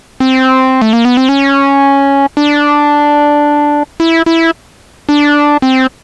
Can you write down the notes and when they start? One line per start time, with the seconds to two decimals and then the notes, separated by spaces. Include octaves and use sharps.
0.20 C4
0.82 A3
0.93 A#3
1.05 B3
1.17 C4
1.29 C#4
2.37 D4
4.00 E4
4.26 E4
5.09 D4
5.62 C4